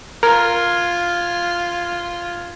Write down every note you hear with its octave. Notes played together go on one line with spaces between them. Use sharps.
F4 A#4 F6 G#6